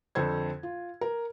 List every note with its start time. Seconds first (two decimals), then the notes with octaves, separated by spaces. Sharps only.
0.15 F2 D3 A4 C5 G#6
0.63 F4
1.01 A#4